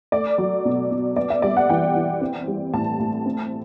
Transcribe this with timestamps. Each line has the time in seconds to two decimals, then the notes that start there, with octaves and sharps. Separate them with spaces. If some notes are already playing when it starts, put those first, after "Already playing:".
0.12 A3 D5
0.38 F#3
0.65 B2
0.91 B2
1.16 B3 D5
1.30 E5
1.42 G3 D5
1.57 F#5
1.69 E3 G5
1.95 E3
2.21 C4
2.48 G3
2.73 A2 A5
2.99 A2
3.26 C4